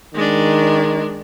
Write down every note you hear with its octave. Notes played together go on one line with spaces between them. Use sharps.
D#3 G#3 D4